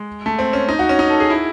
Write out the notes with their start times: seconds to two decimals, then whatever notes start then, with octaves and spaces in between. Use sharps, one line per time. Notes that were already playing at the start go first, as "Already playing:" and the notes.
Already playing: G#3
0.26 A3
0.39 C4
0.53 C#4
0.69 D#4
0.79 F#4
0.89 C#4
0.99 D#4
1.10 A4
1.20 G#4
1.30 E4